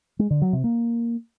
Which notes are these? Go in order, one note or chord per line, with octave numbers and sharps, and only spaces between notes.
G#3
D3
F#3
C3
A#3